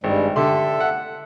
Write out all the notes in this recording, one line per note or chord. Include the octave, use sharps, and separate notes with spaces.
G#1 G2 G3 G#3
D3 G4 A4 E5 C6
F#5